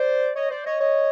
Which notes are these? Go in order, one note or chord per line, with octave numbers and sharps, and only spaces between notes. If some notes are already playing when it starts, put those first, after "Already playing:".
Already playing: C5 D5
C#5 D#5
C5 D5
C#5 D#5
C#5 D#5